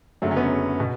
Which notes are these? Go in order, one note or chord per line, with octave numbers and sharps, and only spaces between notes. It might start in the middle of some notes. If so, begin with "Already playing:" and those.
F#1 F#2 D3 F#3 A3
C#4
B3
B2